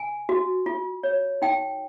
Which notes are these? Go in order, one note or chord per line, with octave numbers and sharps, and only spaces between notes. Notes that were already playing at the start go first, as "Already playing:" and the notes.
Already playing: G#5
F#4
F4
C#5
D#4 G5